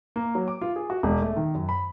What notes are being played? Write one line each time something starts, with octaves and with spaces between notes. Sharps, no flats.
A#3
F#3
D6
F4
G#4
F#4
E1
A3
D#3
F#2
B5